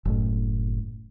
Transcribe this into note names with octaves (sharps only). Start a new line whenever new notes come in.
F#1 A2